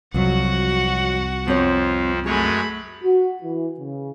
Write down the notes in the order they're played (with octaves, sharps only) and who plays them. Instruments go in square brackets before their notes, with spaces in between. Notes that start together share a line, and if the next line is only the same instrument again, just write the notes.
[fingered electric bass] C2 [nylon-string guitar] F2 F#3 [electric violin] F#4 F#5
[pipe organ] F2 F3 [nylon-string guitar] B3 C4 C#5
[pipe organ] F#2 G#3 C#5 [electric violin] A3 B5 [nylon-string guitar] G#4
[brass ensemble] F#4
E3
C#3